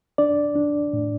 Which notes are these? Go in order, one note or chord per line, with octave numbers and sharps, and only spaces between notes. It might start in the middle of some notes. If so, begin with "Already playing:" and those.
D4 D5
D4
A2